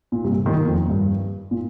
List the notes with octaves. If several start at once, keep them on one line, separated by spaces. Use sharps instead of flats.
A#2
G2 C3
A#2 D#3
F2 A#2
G2
A#2